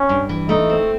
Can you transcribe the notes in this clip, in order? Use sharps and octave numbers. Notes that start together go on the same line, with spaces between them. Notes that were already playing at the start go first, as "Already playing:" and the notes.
Already playing: C#4
G2
E3
A3 D#4
C4